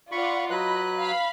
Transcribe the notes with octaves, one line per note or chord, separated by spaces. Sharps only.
F4 D5 F#5 B5 C#6
F#3 B4 D#5 B5 F#6
F5 B5